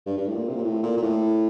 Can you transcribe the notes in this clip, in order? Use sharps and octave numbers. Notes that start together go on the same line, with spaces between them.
G2
G2
A2
A#2
C3
A#2
A2
A#2
A#2
A2